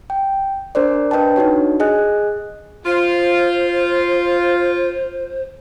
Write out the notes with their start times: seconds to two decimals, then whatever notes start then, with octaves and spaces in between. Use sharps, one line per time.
0.10 G5
0.75 D4 A#4 C5 D5
1.11 D4 B4 D#5 G5 A5
1.36 D4 D#4 F#4 C#5
1.80 G#4 D#5 G#5 F#6
2.86 F4 C5